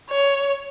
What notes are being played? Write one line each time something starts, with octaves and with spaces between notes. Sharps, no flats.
C#5